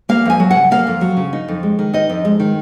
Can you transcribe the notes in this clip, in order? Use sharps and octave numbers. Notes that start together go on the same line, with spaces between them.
A#3 F5
F2 G#5
F#3
C#3 F#5
A#3 F5
F2
F#3
C#3
D#4
F2
G#3
D#3
D#4 D#5
F2
G#3
D#3